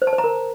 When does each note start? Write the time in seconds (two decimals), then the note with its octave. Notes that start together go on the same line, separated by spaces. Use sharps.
0.02 C5
0.07 A5
0.13 C5
0.18 A#5
0.24 A#4